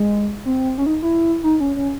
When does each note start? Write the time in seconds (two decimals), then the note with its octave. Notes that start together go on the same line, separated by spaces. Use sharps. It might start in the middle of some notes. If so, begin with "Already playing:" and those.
Already playing: G#3
0.45 C4
0.78 C#4
0.86 D#4
1.02 E4
1.43 D#4
1.60 C#4
1.76 C#4